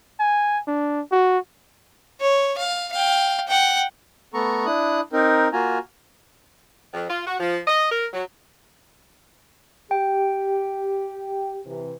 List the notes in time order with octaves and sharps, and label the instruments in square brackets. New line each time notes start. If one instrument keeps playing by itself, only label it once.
[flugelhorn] G#5
D4
F#4
[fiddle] C#5
F5
F5 G5
F#5 G5
[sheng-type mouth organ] A3 B3 A4 A#5 C#6
D4 E4 D#6 F#6
C4 D#4 A#4
A#3 F4 F#4 G#5 A#5
[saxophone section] F2
F4
F#4
F3
D#5
A#4
F#3
[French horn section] G4 [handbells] G5
[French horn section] C3 E3